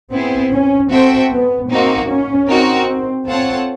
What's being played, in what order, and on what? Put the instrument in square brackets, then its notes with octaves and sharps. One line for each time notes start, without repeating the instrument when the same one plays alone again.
[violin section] B3 E4 G#4 C5 [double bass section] C4
[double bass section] C#4
[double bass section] C4 [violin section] F#4 A4 C5 E5 G5
[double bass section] B3
[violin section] A#3 D#4 F#4 [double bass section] C4
[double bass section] C#4
[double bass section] C4 [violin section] D#4 F#4 A#4
[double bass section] C4 [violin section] F4 A4 C#5 F#5 A5